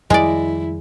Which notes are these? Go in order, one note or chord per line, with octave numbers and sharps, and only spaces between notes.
F2 D#3 G3 G#3 E4 D5